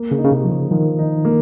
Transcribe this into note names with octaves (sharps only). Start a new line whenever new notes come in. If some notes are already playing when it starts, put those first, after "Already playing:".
Already playing: A#3
C#3
D#4
C#3
C3
F3
C#3
D#3 F3
D#4
A#3